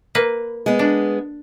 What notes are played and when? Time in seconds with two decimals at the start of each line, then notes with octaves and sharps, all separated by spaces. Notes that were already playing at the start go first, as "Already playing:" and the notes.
0.15 A#3 B4
0.66 G#3 B3
0.79 D4